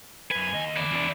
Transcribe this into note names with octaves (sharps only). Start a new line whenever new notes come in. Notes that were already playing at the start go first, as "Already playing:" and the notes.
F#2 B4 G#5
D#2 D#5
E4 D5
E2 D4